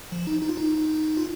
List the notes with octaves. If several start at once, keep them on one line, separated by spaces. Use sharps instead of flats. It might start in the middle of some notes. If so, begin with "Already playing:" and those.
F3
D#4
D#4
F4
D#4
F4